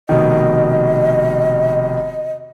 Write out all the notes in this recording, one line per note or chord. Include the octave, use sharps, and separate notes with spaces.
F1 B2 D#3 D#5